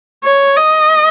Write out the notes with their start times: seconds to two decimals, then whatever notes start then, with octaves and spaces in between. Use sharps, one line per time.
0.24 C#5
0.57 D#5